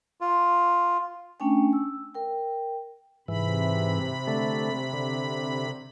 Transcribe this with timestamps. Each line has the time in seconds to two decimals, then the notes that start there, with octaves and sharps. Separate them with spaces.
0.21 F4
1.40 A3 C#4 D4 G5 G#5
1.73 E6
2.15 A#4 G5
3.28 G#2 C3 E3 B5
4.27 D3 A3
4.93 D3